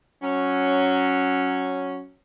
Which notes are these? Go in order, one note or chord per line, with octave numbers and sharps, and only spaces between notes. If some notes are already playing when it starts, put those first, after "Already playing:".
F#3 C#4